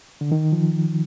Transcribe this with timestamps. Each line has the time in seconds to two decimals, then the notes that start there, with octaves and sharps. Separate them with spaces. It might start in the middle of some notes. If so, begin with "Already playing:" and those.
0.21 D3
0.32 D#3
0.52 F3